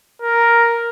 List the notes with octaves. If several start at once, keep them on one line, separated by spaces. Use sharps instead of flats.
A#4